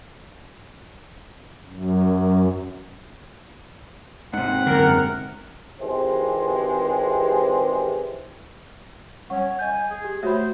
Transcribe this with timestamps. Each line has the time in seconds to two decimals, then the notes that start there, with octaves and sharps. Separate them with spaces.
1.67 F#2
4.33 G#2 C3 F#5
4.66 F#2 D3 A#4
5.80 G#1 C3 E3 G#3 G4 C5
9.30 G3 C#4 F#5 C#6
9.59 D#5 G#5 G6
9.90 G#4
10.04 G4
10.23 A3 F#4 C5 C#5 E5 B5